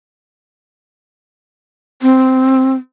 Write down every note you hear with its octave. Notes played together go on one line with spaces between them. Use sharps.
C4